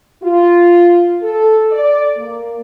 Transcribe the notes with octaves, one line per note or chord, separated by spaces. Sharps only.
F4
A4
D5
A#3